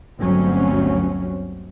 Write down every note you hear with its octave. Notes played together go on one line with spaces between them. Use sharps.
G1 D2 F#3 C4 C#4